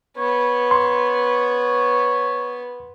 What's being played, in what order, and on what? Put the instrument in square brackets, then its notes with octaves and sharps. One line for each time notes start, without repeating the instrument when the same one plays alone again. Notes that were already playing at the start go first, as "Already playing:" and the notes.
[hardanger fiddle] B3 [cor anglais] C#5
[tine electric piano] C6